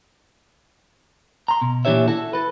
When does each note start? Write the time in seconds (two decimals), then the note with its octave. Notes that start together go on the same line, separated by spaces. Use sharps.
1.48 A#5 C6
1.61 B2
1.85 A#2 E3 D4 G4 C#5 E5
2.08 E4 F#4 A4
2.33 A4 B4